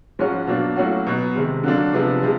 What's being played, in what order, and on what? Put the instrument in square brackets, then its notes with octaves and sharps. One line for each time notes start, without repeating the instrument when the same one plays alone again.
[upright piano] G#2 F3 G#3 C#4 F#4
B2 F#3 A#3 D4
A2 F#3 A#3 C#4 F#4
B2 F#3 B3 D#4
C3 D#3 G#3
D3 F#3 A#3 D4
C3 F3 G#3 B3 D4
C3 F3 G#3